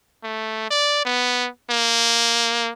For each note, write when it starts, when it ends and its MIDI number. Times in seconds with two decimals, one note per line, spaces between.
0.23 0.67 57
0.71 1.01 74
1.05 1.49 59
1.70 2.72 58